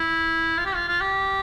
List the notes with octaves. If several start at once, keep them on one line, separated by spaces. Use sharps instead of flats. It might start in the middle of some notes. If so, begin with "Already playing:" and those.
Already playing: E4
F4
G4
F4
F4
G4